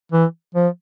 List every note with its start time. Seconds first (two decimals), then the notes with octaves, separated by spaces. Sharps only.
0.12 E3
0.55 F3